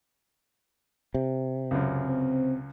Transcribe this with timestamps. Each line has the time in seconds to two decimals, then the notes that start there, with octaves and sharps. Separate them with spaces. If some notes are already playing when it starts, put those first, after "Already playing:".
1.14 C3
1.71 C#2 F#2
2.05 C4